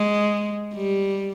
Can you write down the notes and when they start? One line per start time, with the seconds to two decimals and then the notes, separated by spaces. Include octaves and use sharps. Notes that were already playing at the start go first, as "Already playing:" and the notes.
Already playing: G#3
0.74 G3